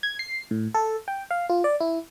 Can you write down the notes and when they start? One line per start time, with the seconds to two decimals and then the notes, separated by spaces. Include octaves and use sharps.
0.03 G#6
0.19 C7
0.51 A2
0.74 A4
1.08 G5
1.31 F5
1.49 F4
1.64 D5
1.81 E4